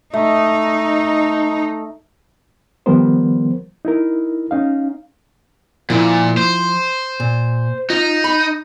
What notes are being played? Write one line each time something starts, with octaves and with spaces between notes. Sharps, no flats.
A3 D#4
D#3 F3 G3 B3 A#4 C5
D#4 E4 A#4
C#4 D#4 F5
A#2 F3 E4
C5
A#2
D#4 F4
B5